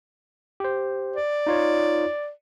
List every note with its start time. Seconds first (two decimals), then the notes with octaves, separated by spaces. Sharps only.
0.60 G4 C5
1.16 D5
1.47 D#4 F4 C#5